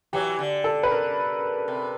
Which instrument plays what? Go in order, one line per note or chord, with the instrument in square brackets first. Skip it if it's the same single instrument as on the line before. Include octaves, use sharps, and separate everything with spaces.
[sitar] E3 F#3 [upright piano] G4
[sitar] D3
[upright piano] A4
B4
A#4
[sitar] C3